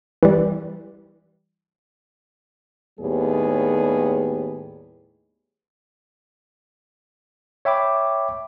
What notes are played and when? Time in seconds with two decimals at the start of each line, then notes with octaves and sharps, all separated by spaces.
0.23 E3 G3
3.00 D#2 A2 G3 B3 G#4
7.65 C#5 E5 G5 B5 D6